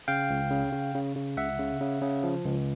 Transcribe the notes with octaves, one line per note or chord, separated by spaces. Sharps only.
C#3 F5 G5
C#2
C#3
C#3
C#3
C#3
C#2 E5 F#5
C#3
C#3
C#3
F3
C#2